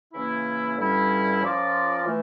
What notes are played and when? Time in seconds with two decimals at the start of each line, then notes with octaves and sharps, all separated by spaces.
0.13 C#3 E3 A#3 C#4 E4
0.77 G2 D3 G3 C#4 E4
1.41 F3 C#4 F4 A#4 D5
2.05 E3 A3